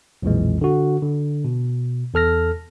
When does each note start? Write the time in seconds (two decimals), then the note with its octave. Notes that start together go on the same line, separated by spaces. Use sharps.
0.22 B1 F2 A#2 E3 G#3
0.61 D3 F#4
1.02 D3
1.45 B2
2.14 E2 A4 F6 A#6